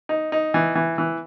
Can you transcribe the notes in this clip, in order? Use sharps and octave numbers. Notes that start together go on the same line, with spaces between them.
D#4
D#4
E3
E3
E3